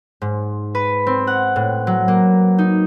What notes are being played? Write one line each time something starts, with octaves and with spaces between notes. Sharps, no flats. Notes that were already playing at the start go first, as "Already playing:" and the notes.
G#2
B4
C4
F#5
A2
F#3
A#3
D#4